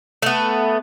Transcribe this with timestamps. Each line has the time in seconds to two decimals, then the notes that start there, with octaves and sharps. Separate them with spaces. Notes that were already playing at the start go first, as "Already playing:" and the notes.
0.22 A3 B3